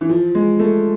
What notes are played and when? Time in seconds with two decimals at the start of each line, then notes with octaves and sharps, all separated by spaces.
0.01 E3
0.09 F3
0.35 G#3
0.59 A3